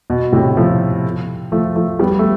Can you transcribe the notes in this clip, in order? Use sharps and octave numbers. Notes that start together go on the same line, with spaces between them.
B2
A2 C3
F3 A3
F3 A3
F3 A3
G3 B3
A3